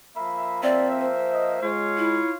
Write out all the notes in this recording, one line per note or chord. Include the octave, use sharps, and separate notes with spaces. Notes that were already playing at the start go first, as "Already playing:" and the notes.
F3 A#3 E5 B5
C4 D5
C5
D#5
G#3 F4 C#5
E4